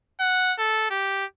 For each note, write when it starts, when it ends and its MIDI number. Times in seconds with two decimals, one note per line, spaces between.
0.20 0.54 78
0.59 0.88 69
0.90 1.25 67